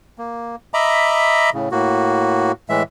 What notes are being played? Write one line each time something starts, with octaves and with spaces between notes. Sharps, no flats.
A#3
D#5 E5 A#5 B5 D6
A2 C#3
A2 A#3 F#4
A2 E3 G#3 E5